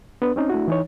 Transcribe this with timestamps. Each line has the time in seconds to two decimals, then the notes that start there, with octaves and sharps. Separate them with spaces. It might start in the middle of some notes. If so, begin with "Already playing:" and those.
0.22 B3 D4 B4
0.36 C4 C#4 D#4
0.50 A3 D4 E4 F#4
0.68 E3 D#4 C#5